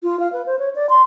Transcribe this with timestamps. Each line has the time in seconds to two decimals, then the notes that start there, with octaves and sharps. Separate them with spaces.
0.03 F4
0.20 F5
0.33 B4
0.46 C5
0.59 C#5
0.75 D5
0.90 C6